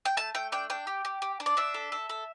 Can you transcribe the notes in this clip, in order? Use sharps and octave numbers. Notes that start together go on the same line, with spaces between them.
G5
A3 A5
A3 G5
D4 G5
D4 G5
G4
G4
G4
D4
D5
D4 E5
A4
A4
A4